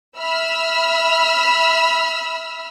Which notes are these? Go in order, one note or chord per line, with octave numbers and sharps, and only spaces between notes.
E5 B5 E6 F6